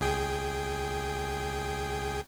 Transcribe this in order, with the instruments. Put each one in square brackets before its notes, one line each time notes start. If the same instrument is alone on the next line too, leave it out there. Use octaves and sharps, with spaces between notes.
[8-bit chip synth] C#2 G#4 G5